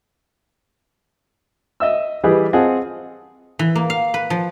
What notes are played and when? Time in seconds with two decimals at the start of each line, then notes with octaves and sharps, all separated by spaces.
1.80 D#5 E5 E6
2.23 E3 G3 G4 G#4 B4 D#5
2.53 C4 F4 G#4 D#5 F#5 A5
3.59 E3
3.75 A#3
3.90 F5
4.14 B4
4.30 F3